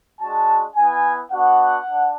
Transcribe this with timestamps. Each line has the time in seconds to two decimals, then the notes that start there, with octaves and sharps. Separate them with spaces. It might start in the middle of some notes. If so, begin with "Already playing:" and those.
0.20 G#3 D4 F#4 A5
0.77 B3 E4 G#5
1.32 B3 D4 F#4 F#5
1.89 D4